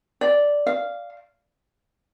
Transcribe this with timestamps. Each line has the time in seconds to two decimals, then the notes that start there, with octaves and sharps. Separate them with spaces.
0.21 D5
0.67 F5